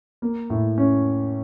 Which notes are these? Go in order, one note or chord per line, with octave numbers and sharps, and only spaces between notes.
A#3
A2
C#4